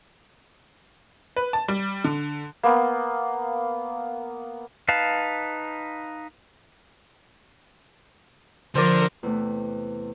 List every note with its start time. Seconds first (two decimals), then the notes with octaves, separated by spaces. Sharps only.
1.36 B4
1.53 A5
1.68 G3
2.04 D3
2.63 A#3 B3
4.88 D#4 B4 F5 A5
8.75 D3 F3 A#4 C5 D5
9.23 E2 C3 A3